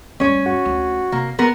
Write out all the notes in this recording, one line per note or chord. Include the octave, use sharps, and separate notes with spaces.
D2 G2 C#4 C#5
F#4
D2
C3 A#3
A#3 B3 A#4 B4